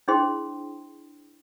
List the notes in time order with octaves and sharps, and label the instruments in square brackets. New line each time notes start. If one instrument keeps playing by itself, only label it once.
[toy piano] D4 E4 G#4 C5 G5 C6